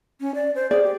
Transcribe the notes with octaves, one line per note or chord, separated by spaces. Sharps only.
C#4
D5
C5
G#4 D5
G4